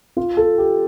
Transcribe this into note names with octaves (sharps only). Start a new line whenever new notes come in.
F4
A4
G4